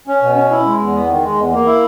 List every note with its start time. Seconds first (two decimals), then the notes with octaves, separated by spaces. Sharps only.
0.08 C#4
0.22 B2
0.36 C#4
0.51 E4
0.65 G#3
0.79 E2
0.94 B3
1.09 D#3
1.23 G#3
1.37 E2
1.52 A#3
1.66 E4